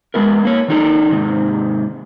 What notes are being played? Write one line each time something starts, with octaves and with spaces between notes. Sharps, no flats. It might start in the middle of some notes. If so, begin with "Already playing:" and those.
G#3 B3 E4 A#4
A#3 C#5
D#3 D#4 A4
G#2 C3 D#3